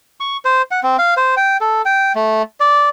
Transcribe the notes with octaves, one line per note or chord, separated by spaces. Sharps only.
C#6
C5
F#5
C4
F5
C5
G5
A4
G5
A3
D5